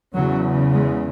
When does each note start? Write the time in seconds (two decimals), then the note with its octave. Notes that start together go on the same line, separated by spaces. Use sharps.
0.14 E2 C#3 F#3
0.73 G#3